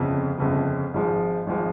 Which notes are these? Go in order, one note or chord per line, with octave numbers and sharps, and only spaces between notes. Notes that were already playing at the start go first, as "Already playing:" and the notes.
Already playing: G1 F2 C#3
G1 F2 C#3
G#1 G#2 F3 G#3
G#1 F3 G#3